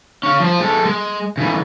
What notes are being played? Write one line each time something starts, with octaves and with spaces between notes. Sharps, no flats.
C#4 F5
F3 C5
G#3 A4
G#3
C#3 E3